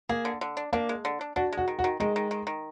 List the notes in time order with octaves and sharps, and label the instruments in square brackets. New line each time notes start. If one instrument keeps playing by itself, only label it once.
[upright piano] A#3 [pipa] G#4
[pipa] D3
D3
D4
[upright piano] A#3 [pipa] D4
[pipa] G#3
D3
D4
[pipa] D4 [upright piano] F#4
[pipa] G#3
[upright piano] F#4
[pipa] D#3
[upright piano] F#4
[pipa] D#3
[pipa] D#3 [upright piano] G#3
[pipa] D#3
D#3
D#3